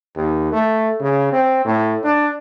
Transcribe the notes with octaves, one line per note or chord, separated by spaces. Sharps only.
D#2
A3
C#3
C4
A2
D4